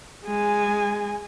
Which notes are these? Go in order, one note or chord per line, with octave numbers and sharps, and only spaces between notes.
G#3 G#5